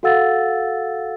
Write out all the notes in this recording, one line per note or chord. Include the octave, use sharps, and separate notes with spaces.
F#4 A4 F5 F#5 E6 A6